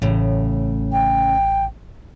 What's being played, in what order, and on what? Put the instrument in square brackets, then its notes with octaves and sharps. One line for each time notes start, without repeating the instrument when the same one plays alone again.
[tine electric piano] A1 [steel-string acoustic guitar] A2 C#3
[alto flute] G5